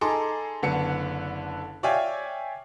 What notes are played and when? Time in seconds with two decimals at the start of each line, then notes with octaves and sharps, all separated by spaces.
0.01 D#4 G#4 A4 A#5 C6 D6
0.63 F#1 D3 B3 C#7
1.83 C#5 D5 E5 F5 G5 G#5